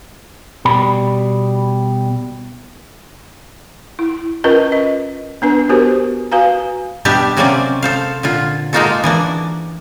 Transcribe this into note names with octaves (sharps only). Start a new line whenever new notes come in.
B2 G3 B5
E4
C#4 F4 A#4 B4 D#5
D#5
B3 D4 B4
B3 F#4 G4 A#4 C5
F#4 B4 F5 G#5 A#5
B2 G3 D4 G4 E5
C3 F#3 A#3 C4 C#4 D5
A4 C5 F5
A#2 D3 F4
G#3 A#3 D#4 F4 F#4 A4
E3 A#3 D4